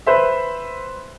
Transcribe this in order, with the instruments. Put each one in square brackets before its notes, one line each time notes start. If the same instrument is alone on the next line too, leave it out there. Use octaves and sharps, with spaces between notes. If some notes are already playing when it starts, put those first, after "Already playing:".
[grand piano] B4 C5 E5